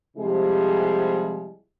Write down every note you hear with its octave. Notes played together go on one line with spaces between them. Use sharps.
C3 F3 G3 G#3 E4 G#4